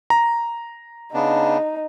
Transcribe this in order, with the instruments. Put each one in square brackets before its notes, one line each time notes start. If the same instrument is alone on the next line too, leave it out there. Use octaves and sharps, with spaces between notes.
[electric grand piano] A#5
[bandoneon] C#3 B3 D4 [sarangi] D#4